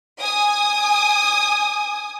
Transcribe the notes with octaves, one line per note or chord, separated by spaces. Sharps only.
G#5 D#6